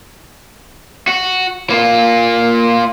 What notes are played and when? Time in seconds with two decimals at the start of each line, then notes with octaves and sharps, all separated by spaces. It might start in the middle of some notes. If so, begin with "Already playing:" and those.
1.07 F#4
1.70 A#3 F4